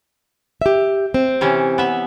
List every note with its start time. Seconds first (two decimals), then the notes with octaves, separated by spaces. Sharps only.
0.61 G4 E5
1.14 C4
1.41 C3 E3 C#4
1.78 B3 E5